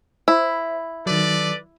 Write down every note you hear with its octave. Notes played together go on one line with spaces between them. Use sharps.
E4 C5 E5 B5
D#3 F#3 A4 B4 D5